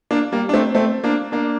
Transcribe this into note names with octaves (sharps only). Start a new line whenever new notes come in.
A#3 D4
G3 A#3
D4
A3 C4
A3 C4
A#3 D4
A#3 D4